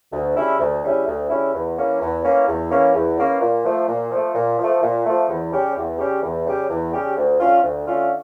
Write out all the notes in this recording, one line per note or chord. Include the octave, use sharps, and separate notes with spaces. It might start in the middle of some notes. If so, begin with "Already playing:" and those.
D2
C#3 G3 C#4 E4
D2
C#3 G3 C#4 E4
D2
C#3 G3 C#4 E4
E2
E3 A#3 C#4
E2
E3 A#3 C#4
E2
E3 A#3 C#4
E2
E3 A#3 C#4
A#2
F3 A3
A#2
F3 A3
A#2
F3 A3
A#2
F3 A3
E2
C#3 G3 C#4 G4
E2
C#3 G3 C#4 G4
E2
C#3 G3 C#4 G4
E2
C#3 G3 C#4 G4
D2
D3 A3 C#4 F4
D2
D3 A3 C#4 F4